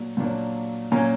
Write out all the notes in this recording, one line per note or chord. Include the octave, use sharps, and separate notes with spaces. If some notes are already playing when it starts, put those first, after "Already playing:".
Already playing: A#2 F#3 A#3 D4
A#2 F#3 A#3 D4
A#2 F#3 A#3 C#4 G#5 A#5